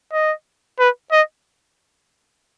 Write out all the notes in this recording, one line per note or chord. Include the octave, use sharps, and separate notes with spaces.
D#5
B4
D#5